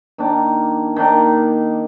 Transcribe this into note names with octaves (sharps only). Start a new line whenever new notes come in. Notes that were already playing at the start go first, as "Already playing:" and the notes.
D#3 A#3 D4
D#3 A#3 D4